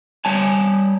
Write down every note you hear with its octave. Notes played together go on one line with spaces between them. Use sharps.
G3 C#5 G#5 A5